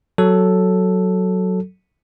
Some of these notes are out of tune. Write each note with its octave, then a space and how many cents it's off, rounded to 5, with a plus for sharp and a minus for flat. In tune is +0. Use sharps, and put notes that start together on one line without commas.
F#3 +5 A4 +0